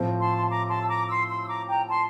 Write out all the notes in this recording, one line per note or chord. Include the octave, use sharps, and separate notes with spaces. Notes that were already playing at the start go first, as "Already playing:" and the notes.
Already playing: A2 F3 C4
A5 C6
C6
A#5 D6
A5 C6
E6
A#5 D6
C6 E6
C6 E6
E6
A#5 D6
G5 A#5
A5 C6